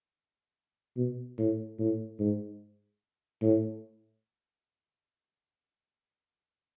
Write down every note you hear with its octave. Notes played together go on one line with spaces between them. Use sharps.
B2
A2
A2
G#2
A2